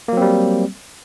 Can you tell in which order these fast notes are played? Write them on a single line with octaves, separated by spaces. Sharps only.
A#3 F#3 C4 G3